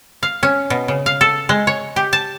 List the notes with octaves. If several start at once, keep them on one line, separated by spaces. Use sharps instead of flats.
F5
C#4
B2
C#3
F5
A4
G#3
C#5
G4
A5